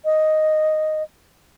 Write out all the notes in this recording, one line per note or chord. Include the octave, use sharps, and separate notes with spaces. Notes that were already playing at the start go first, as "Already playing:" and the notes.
D#5